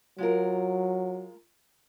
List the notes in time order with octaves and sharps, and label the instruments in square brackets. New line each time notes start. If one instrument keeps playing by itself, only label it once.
[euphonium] F#3 [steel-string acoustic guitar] G#3 F4 A#4